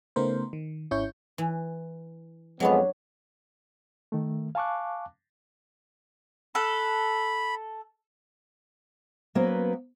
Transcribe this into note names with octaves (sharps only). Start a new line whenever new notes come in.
C#3 A3 B3 D#4 A#4 C5
D#3
G#1 C#4 E4 C#5 C#6 G6
E3
F2 F#3 G#3 B3 D4 C#5
D#3 A3
F5 G#5 A5 C#6 D6 F#6
A4 B5 F#6
F#3 A#3 B3 C#4 B4 C5